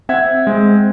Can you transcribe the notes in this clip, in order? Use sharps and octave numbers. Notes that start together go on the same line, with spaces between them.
C4 E5 F#5 G#6
G#3 C4